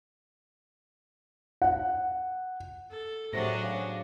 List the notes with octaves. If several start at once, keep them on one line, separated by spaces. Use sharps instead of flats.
F#5
A4
A2 C3 F#3 D4 F#4 G#4 A#6
C#3